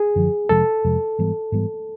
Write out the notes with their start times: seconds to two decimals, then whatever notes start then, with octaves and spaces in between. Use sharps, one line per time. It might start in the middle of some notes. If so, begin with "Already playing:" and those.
Already playing: G#4
0.16 F#2 D3 F3
0.49 F2 C3 F3 G#3 A4
0.84 F2 C3 F3 G#3
1.19 G#2 E3 G3 B3
1.52 G#2 E3 G3 B3